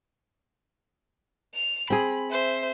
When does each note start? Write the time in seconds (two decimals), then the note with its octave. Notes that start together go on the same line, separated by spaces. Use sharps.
1.54 F7
1.90 C4 G#4 B5
2.31 C5 E5